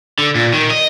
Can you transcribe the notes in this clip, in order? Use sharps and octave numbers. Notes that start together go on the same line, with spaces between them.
D3
A#2
D#3
D#5